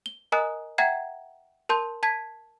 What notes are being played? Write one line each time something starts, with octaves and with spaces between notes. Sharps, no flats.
G7
A#4 D#5 G#5 A#5 D#6 F#6
E5 F#5 G5 A#5 G#6 C7
A#4 A5 C6 G6
A5 G#6 B6